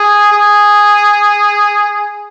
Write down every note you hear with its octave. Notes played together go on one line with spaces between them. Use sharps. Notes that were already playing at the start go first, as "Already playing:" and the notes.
Already playing: G#4
G#4